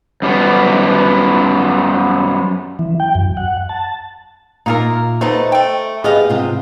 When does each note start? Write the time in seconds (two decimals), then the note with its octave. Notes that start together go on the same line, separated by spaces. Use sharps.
0.22 F#2 G3 B3
2.79 E3
3.00 G5
3.15 F#2
3.37 F#5
3.69 A5
4.66 A#2 D#4 F4 A#4 E5
5.21 A3 B3 D#4 C5 D#5 A5
5.52 A3 G5
6.04 B3 G4 G#4 D#5 F5
6.30 G#2 C3 F4